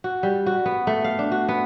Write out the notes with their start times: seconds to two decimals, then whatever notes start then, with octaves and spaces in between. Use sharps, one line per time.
0.04 F#4
0.23 G3
0.46 F#4
0.66 B3
0.87 A3
1.04 F5
1.19 D4
1.32 F#4
1.49 B3